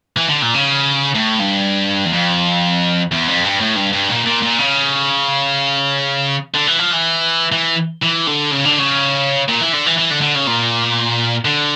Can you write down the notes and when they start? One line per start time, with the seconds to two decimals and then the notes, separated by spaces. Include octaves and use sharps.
0.17 E3
0.29 D3
0.42 A#2
0.54 C#3
1.15 A2
1.39 G2
2.05 E2
2.13 F2
3.12 E2
3.28 F2
3.44 G2
3.61 A2
3.76 G2
3.93 G2
4.09 A#2
4.26 A#2
4.43 A#2
4.59 C#3
6.54 D3
6.67 E3
6.79 F3
6.91 E3
7.52 E3
8.02 E3
8.27 D3
8.51 C#3
8.65 D3
8.79 C#3
9.48 A#2
9.61 E3
9.73 D3
9.86 E3
9.98 E3
10.10 D3
10.22 D3
10.35 C#3
10.47 A#2
11.45 D3